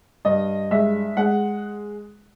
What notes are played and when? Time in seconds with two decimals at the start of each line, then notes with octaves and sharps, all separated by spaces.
0.25 G2 D#5
0.71 G#3 E5
1.17 G#3 F#5